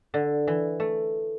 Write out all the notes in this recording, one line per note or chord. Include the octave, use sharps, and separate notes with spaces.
D3
E3
A3